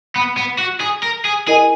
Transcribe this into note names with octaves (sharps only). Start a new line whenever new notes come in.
B3
B3
F#4
G#4
A#4
G#4
E4 G#4 A#4 D#5 G#5